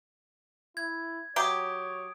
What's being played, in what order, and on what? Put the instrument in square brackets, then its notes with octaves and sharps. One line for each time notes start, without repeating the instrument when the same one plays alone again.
[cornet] E4 [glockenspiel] G#6
[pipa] F#3 G4 [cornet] C#5 [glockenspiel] D#6 D7